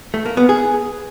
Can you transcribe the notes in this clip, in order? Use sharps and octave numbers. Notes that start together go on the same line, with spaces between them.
A3
A#3
B3
G#4